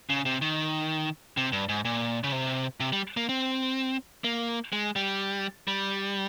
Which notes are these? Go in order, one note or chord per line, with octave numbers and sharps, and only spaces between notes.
C#3
C3
D#3
C3
G2
G#2
A#2
C#3
C3
C3
G3
A#3
C4
A#3
G#3
G3
G3